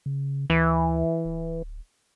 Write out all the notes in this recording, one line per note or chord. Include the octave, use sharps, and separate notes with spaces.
C#3
D2 E3
D1